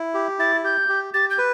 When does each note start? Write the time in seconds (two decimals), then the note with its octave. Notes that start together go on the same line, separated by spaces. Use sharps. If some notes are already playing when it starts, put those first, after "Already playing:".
Already playing: E4
0.14 G4
0.39 E4 A6
0.64 G4 G6
0.89 G4
1.14 G4 A6
1.30 G6
1.38 B4